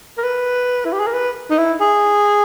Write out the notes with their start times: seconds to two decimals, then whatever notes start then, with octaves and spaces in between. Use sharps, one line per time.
0.18 A#4
0.24 B4
0.85 E4
0.93 G4
0.99 G#4
1.07 A#4
1.14 B4
1.50 D#4
1.58 E4
1.81 G#4